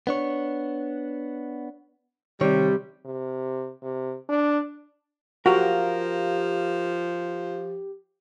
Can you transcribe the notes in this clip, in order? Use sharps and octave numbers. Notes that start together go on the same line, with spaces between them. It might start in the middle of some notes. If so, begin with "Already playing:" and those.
B3 D4 C#5
C3 D#3 G3 C#5
C3
C3
D4
F3 F#4 G4 A#4 F5